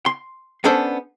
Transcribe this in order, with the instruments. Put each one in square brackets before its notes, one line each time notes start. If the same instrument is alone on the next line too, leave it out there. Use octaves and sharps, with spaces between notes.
[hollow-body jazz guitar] C6
B3 C#4 D4 A4 C5 D5